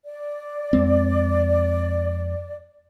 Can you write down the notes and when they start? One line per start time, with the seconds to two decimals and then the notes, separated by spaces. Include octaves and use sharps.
0.05 D5
0.73 F2 G#3 C4